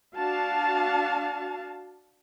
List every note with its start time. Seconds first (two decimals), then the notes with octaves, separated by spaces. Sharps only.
0.17 D4 F#4 F5 A5